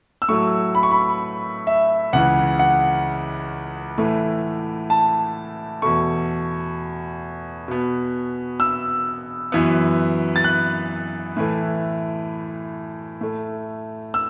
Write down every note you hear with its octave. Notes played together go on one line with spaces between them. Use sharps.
E6
A2 F#3 A3 C#6
B5
C#6
B5
E5
C#2 C#3 E3 F#5
F#5
A2 E3 A3
A5
E2 B2 A3 C#6
B2 B3
E6
F#2 E3 B3
A6
F#6
A2 E3 A3
A2 A3
E6